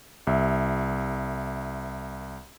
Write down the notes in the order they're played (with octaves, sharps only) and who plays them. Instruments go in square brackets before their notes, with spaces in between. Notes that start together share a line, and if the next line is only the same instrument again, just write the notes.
[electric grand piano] C2 E5